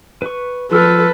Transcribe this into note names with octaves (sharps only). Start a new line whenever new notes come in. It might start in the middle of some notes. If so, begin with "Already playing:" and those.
B4 C#6
F3 F4 A4 B4 E6 F6